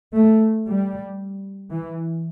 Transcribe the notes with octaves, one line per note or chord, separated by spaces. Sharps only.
A3
G3
E3